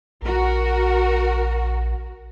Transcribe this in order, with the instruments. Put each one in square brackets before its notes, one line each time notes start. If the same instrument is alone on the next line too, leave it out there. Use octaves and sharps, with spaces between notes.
[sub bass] A#1 [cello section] F#4 A#4